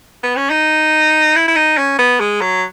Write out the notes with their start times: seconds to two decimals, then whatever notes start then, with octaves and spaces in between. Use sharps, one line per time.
0.23 B3
0.36 C#4
0.50 D#4
1.36 E4
1.48 E4
1.56 D#4
1.77 C#4
1.99 B3
2.20 G#3
2.41 F#3